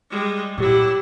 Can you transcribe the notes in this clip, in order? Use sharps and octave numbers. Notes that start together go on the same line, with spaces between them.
G3 G#3
A#2 F#3 E4 G4 D6